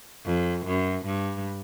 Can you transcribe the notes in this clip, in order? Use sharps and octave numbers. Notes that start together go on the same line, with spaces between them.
F2
F#2
G2